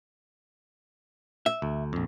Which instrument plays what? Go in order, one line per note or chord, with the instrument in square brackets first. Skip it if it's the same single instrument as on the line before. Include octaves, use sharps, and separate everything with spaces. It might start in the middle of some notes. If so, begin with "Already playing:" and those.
[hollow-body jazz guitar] E5
[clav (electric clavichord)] D2
A#1 F2